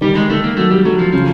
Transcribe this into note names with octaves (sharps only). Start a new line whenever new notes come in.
D#3 G3
G#3
D#3 A3
A#3
F#3 A3
G3
F#3 A3
F3
C#3 F3